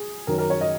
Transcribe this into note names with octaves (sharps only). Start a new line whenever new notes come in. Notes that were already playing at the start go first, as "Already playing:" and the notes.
Already playing: G#4
F#2 D#3 F#3 C#4 A#4
A#4
C#5
D#5